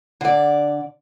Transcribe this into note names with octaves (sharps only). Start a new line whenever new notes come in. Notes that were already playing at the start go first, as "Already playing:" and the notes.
D3 D5